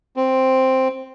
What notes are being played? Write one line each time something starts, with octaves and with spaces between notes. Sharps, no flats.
C4